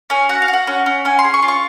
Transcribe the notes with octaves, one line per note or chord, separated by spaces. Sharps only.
C#4 G#5
F#4 F#5
F5
F#4
F#5
C#4
C#4
C#4 G#5
C6
G#4
C#6
F4
C#6